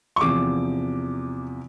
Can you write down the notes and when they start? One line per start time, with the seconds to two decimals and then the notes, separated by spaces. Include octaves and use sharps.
0.16 C#6
0.21 E2 C3 F3 D6